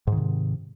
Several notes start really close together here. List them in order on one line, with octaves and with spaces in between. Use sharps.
G#2 D#3 C3